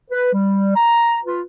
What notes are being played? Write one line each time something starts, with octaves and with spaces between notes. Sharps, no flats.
B4
G3
A#5
F4 B4